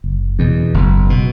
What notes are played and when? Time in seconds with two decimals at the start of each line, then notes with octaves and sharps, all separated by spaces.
0.04 F#1
0.39 E2 B2
0.74 F#1
1.10 B2